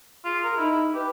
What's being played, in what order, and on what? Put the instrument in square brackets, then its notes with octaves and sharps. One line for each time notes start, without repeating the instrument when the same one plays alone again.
[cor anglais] F4 [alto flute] G#4
[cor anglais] A#4
[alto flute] D#4 [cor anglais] E4
[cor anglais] G4 [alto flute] B4